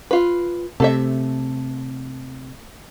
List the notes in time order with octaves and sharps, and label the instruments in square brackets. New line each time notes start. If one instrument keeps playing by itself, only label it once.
[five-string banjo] F4 B4
[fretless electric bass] C3 [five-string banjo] A3 A4 E5